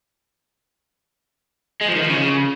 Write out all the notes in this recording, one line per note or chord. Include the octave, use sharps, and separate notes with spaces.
G#3
F3
D#3
F3
C#3